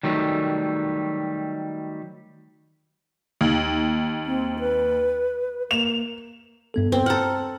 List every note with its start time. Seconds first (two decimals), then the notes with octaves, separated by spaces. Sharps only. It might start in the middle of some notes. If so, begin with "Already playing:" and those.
0.03 D#3 F#3 G3 A3
3.41 D#2
4.26 C4
4.59 B4
5.71 A#3 E7 F7
6.74 G2 B3 A4
6.92 C4
7.06 A4 F#5 A#5 F6